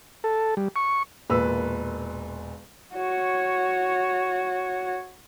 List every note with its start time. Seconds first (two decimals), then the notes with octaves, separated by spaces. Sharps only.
0.24 A4
0.57 G3
0.76 C#6
1.30 E1 A#2 B4 E6
2.94 F#4 C#5